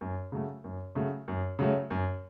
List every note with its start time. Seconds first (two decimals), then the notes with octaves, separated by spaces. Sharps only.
0.01 F#2
0.32 C#3 F#3 A3
0.64 F#2
0.95 C#3 F#3 A3
1.28 F#2
1.59 C#3 F#3 A3
1.90 F#2